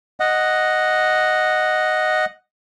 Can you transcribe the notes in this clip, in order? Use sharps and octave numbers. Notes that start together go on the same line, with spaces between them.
D#5 F#5